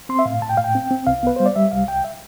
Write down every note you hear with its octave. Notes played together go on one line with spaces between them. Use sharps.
C4 C6
E5
A2 F5
A2 A5
G5
A2 F5
G5
C4
C4
C2 F5
B3 B4
G3 C5
D5
G3 E5
C2 F5
C2 G5
E5